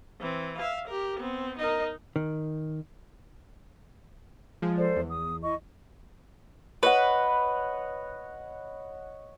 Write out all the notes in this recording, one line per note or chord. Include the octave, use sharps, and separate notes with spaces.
E3 C4
E5 F5
G4 A#4
B3 C4
D#4 A#4 D#5
D#3
F3 G#3
A4 C5 D5
E2
D#6
E4 D#5 C#6
B4 C#5 D#5 F#5